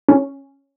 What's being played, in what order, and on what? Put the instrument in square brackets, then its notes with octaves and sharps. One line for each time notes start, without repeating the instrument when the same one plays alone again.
[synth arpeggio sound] C#4